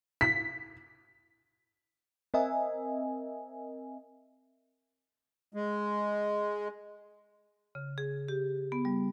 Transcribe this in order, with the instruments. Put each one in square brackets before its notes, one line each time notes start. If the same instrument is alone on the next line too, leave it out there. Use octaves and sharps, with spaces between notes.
[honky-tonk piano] B6
[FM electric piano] C4 A#4 D#5 E5 G#5
[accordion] G#3
[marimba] C#3
G#4
G4
B3
G3